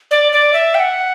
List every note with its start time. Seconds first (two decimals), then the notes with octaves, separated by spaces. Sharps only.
0.11 D5
0.32 D5
0.53 E5
0.75 G5
0.79 F#5